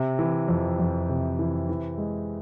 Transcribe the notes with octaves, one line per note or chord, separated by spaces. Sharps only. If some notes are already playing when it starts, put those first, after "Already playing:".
Already playing: C3
E3
F2
F2
C3
E3
E3
G#3